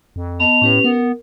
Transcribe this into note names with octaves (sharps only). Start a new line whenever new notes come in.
F2
B3 D#5 A5 F7
A2 C#4 G4 B4
B3 A#4